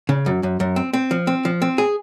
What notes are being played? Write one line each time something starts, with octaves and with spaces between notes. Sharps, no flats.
C#3
F#2
F#2
F#2
C4
C4
F3
C4
F3
C4
G#4